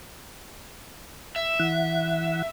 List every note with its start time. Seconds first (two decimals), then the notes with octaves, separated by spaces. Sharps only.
1.36 E5
1.60 E3 F#5